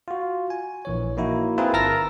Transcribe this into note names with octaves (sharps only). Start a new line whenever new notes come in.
F4 F#4
G#5
A#1 E3 C#5
A#3 D#4 E4 F#4
C4 E4 F4 G#4 A#4 B4
G1 A#4 A5 E6 F6 A#6